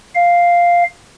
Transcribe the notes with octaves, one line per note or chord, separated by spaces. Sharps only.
F5